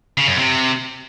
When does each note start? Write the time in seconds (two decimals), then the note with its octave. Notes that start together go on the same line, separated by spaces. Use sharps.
0.18 C#3
0.27 F#2
0.37 C3